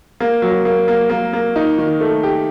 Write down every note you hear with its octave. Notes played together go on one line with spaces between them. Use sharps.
A#3
F#3
A#3
A#3
A#3
A#3
D#4
D#3
A3
G4